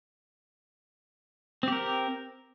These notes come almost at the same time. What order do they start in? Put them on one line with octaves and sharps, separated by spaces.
C4 G4 A#4